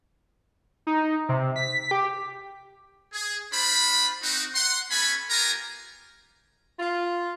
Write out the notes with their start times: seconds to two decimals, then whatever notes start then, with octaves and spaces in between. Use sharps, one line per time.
0.87 D#4
1.29 C3
1.56 B6
1.91 G4
3.13 G#4
3.53 D4 F4 C5 B5
4.23 C4 D#4 F#4
4.54 F#5 C6
4.91 B3 C#4 A4 G#5 B5
5.30 B3 F4 G4 A#4 G#5 A#5
6.79 F4